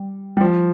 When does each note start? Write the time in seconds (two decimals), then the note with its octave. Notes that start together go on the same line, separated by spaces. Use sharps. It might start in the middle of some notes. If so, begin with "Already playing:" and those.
Already playing: G3
0.37 G3
0.41 F3